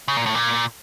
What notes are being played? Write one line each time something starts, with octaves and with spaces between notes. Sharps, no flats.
C#3
A#2
A2
A#2